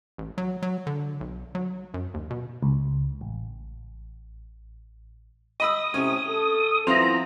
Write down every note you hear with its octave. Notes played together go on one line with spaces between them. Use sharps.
A1
F#3
F#3
D3
B1
F#3
F#2
D#2
B2
C#2
A1
D#5 B5 D#6 E6
A2 C3 C#4
A4
F3 B3 C4 E4 A#5 C6